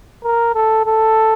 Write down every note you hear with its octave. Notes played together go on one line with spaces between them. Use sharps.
A#4
A4
A4